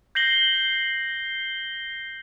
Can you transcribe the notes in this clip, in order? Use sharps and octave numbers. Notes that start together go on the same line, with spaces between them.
G6 A#6 C7 F#7 G7